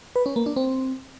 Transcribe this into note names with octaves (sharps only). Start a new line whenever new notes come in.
B4
C#4
A#3
D4
C4